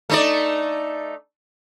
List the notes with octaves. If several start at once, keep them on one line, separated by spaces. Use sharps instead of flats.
A3 D#4 D5